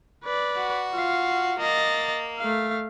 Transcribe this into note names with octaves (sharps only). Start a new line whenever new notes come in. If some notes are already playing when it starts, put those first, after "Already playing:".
B4 D5
F#4
F4 F5
A#3 D#5 A6
A3 F5